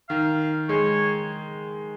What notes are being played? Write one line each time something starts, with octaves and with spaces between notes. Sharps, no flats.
D#3 F5
G#3 C#5